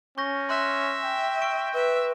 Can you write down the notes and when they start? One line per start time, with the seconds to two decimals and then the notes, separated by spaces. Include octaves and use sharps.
0.18 C#4 C#6 G6 A#6
0.49 E5 C6 F#6 A#6
1.04 G5
1.41 C#6 D7
1.74 B4 E5